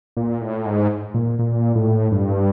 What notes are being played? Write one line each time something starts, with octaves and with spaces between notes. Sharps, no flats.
A#2
A2
G#2
A#2
A#2
A2
G2